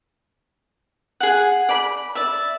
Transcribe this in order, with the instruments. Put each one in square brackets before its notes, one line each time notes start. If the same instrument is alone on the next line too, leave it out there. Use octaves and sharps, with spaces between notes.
[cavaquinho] G#4 F#5
D5 B5
D5 E5